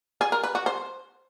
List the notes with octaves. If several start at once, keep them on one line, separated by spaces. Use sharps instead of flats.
G#4
A#4
B4
F#4
C5